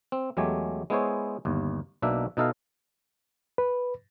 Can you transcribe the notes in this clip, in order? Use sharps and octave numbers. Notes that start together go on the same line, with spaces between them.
C4
E2 F#3 G#3 A3 G4 G#5
G#3 B3 E4 G#4 C5 C#5
G1 D#2
B1 B2 A#3 D4 E5
B2 D#4 E4 A4 D#5 F5
B4